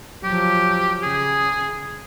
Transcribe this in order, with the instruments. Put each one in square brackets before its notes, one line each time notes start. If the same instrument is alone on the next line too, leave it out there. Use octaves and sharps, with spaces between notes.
[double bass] F3 F#3 [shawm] G4
[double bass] C#3 [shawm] G#4